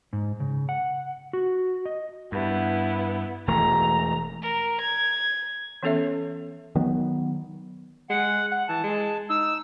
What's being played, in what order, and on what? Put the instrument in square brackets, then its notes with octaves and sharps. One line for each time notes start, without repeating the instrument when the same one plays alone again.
[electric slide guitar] G#2
C#3
F#5
F#4
D#5
[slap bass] G2 [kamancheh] B3 E4
[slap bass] E1 E3 A3 [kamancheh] A#5
[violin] A#4
G#6
[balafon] E3 B3 C#4 A4 C#5 E5
[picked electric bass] D#3 F#3 B3
[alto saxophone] G#3 [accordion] F#5
[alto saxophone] F#5
[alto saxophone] E3 [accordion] A5
[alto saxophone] G#3
[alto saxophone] D#4 [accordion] E6